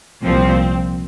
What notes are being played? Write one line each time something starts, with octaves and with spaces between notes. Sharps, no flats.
C2 A#2 F3 C4